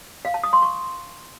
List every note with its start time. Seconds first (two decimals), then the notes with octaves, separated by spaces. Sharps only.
0.25 F5
0.34 A5
0.44 D#6
0.53 C6
0.62 C#6